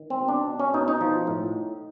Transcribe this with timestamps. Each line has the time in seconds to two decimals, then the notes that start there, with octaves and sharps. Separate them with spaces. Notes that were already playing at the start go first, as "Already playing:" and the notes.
Already playing: D#3
0.10 C4
0.20 B2
0.28 D4
0.47 B2
0.60 C#4
0.74 B2 D#4
0.88 D#4
1.01 F3
1.27 A2